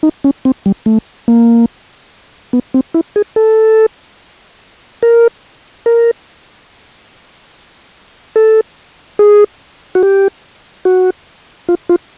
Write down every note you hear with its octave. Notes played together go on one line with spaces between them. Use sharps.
D#4
C#4
C4
G3
A3
A#3
B3
C4
E4
G#4
A4
A#4
A#4
A4
G#4
F#4
G4
F#4
F4
F4